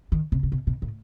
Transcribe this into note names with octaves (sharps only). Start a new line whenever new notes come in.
D#3
C3
C3
B2
B2
A2